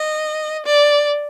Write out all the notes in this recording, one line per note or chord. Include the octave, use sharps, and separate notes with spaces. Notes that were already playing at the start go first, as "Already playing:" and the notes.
Already playing: D#5
D5